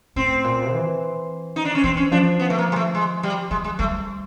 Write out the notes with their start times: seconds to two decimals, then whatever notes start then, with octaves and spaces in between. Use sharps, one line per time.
0.16 A2 C4
0.44 A#2
0.72 E3
1.56 D#4
1.65 D4
1.75 C#4
1.84 E3 C4
1.97 C#4
2.11 F3 D4
2.40 B3
2.50 A3
2.58 A#3
2.72 G#3
2.76 A3
2.95 G#3
3.23 G3
3.51 F#3 G#3
3.64 G#3
3.79 G3 A3